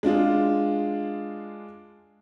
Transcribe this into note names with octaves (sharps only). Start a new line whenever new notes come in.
G#3 D4 F4 G#4